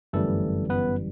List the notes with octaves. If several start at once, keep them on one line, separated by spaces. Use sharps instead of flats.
G1 F#2 E3 G3 A3 A4
B3 B4